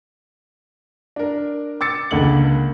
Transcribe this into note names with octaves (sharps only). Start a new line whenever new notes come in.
D4 A#4
D6 E6 A6 C#7
C#2 D3 A#3 F#7